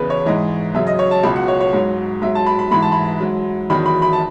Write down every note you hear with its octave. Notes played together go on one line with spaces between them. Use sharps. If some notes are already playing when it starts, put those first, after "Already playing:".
Already playing: E2 C#3 E3 B4
C#5
G#2 E3 D#5
F#2 C#3 F#3 E5
D#5
C#5
A5
C#2 B2 F#3 B5
F#5
C#5
C#5
G#2 F#3
G#2 F#3 E5
A5
B5
B5
G#2 E3 B5
A5
B5
G#2 F#3
E2 D#3 F#3 B5
B5
B5
A5